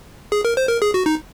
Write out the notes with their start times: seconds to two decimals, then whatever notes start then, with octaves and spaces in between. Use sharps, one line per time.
0.32 G#4
0.45 A#4
0.57 C5
0.69 A#4
0.82 G#4
0.94 F#4
1.06 D#4